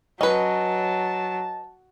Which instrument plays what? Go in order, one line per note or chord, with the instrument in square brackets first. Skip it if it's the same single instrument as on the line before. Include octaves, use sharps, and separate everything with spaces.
[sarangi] F#3 [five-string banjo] C#4 B4 [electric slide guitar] D#5 [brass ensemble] A5